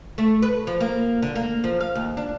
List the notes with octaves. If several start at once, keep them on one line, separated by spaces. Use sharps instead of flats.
A3
B4
F3
A#3
D3
A#3
F3
F5
D#2
D4